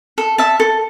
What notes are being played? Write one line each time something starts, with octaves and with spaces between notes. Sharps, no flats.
A4
E5 A5
A4